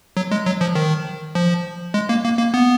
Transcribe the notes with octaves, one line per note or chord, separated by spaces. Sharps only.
F#3
G#3
F#3
F3
D#3
F3
G#3
A#3
A#3
A#3
B3